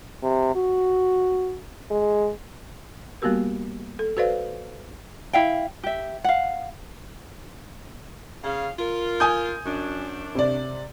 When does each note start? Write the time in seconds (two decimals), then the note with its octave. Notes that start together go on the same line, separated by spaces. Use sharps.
0.23 C3
0.55 F#4
1.91 G#3
3.22 G3 A#3 B3 F#4 G4 A#4
3.99 A4
4.17 F#4 A4 B4 C5 D5 F5
5.33 E4 E5 F5 G5
5.83 G4 E5
6.24 F5 F#5
8.44 C#3 F5
8.79 F4 A#4
9.20 G#5 D#6 G6
9.66 F#2 D4
10.35 C3 D5